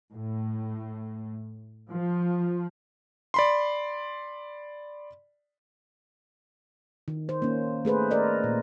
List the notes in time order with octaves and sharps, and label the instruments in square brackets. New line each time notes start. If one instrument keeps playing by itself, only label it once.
[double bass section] A2
F3
[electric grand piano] D5 B5 C6
[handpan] D#3
C5
A#3 C#4
A3 G#4 B4 C5
A#4 D5 D#5
A#2